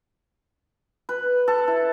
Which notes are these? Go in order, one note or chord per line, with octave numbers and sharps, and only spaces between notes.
B4
A4
E4